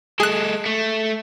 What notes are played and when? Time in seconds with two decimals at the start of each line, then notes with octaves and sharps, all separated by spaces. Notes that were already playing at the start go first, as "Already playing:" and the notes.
0.20 G#3 G#4 A4 F#6
0.66 A3